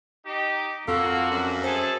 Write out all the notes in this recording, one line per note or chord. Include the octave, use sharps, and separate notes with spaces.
D#4 G4
F2 A#3 C4 F4 F#4 A4
F#2
G#4 A4 C5